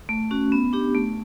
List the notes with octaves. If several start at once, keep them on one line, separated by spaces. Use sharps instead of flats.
A3
C#4 F#4
B3
D4 G4
A3